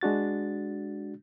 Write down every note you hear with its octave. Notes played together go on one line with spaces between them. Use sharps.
G#3 D4 F#4 A6